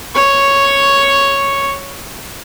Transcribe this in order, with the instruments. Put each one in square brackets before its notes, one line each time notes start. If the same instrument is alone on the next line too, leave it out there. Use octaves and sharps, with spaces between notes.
[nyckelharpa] C#5 C#6